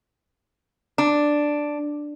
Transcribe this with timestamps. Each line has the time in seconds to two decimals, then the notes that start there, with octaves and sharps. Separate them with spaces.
0.98 D4